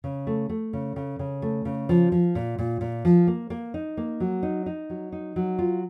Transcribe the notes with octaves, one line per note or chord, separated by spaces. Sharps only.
C#3
A3
A3
C#3
C#3
C#3
A3
C#3
F3
F3
A#2
A#2
A#2
F3
A#3
A#3
D#4
A#3
F#3
D#4
D#4
F#3
D#4
F#3
F4